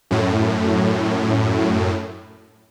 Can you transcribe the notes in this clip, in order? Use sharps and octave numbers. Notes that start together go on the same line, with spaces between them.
F#2 A2